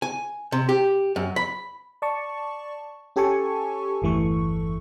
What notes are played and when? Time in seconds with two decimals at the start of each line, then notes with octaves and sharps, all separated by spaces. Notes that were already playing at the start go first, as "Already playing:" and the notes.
0.02 G#5
0.52 C3
0.69 G4
1.16 F#2
1.36 B5
2.02 D5 A5 C#6
3.16 C#4 G4 A4 G#5 A5 C#6
4.02 G1 E2 E3 A3 A4 C#6